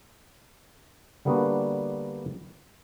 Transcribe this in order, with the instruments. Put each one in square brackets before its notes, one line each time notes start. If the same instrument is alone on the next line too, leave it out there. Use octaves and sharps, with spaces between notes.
[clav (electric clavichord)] D3 G3 A#3 B3 D4 F#4